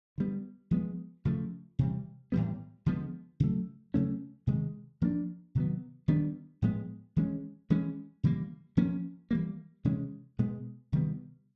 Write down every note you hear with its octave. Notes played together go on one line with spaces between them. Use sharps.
D3 G3 B3
F3 G#3 B3
C#3 F3 A3
C3 E3 G3
A2 E3 G3 B3
D3 F3 G#3 B3
C#3 F#3 A3
C#3 F#3 A3 C#4
C3 D#3 G#3
F3 A#3 D4
C3 D#3 F#3 B3
D#3 G3 B3 D4
A2 F3 G#3 B3
E3 G#3 C#4
E3 G#3 C#4
C#3 E3 G3 A#3
F3 A#3 C#4
E3 G3 A#3
C3 E3 G#3 C#4
B2 G#3 B3
C3 D#3 G3 B3